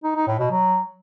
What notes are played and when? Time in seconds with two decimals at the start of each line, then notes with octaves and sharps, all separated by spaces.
0.04 D#4
0.15 D#4
0.27 A2
0.39 B2
0.51 F#3